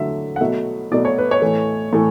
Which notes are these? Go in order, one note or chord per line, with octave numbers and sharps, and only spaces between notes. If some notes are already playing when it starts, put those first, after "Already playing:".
Already playing: D3 F#3 A3 E5
F#5
B2 F#3 A3 E5
B2 F#3 A3 D5
C#5
B4
C#5
A2 E3 A3
A2 E3 A3